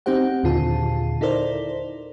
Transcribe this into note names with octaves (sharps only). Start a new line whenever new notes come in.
C4 D#4 G4 C5 F#5
D#2 A#2 D3 F4 G#4 A5
D#4 E4 A4 A#4 C5 D5